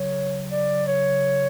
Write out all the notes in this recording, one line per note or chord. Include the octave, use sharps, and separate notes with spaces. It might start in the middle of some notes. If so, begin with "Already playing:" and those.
Already playing: C#3 F#3 C#5
D5
C#5